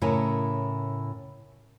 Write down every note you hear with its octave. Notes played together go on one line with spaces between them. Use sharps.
A2 C#3 E4 A#4 C#5 G#5